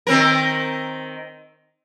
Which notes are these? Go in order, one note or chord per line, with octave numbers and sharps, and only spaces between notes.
D#3 C4 A#4